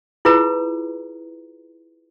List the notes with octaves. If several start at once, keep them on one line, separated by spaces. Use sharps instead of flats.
E4 F4 G#4 B4 A#5